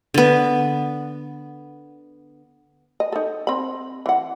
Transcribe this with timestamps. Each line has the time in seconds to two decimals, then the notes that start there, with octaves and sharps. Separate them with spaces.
0.14 D3 B3
3.00 D#5
3.12 D#4 A4
3.47 C4 B5
4.06 E3 F#5